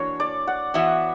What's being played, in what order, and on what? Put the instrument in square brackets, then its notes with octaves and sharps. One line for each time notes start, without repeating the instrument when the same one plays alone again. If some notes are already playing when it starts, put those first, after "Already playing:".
Already playing: [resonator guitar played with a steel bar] E3 A#3 D4 F#4 [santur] C#5
[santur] D5
F#5
[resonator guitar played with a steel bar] E3 B3 F#4 [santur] E5